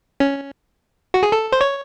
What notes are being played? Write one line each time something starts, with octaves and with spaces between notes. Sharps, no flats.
C#4
F#4
G#4
A4
C5
C#5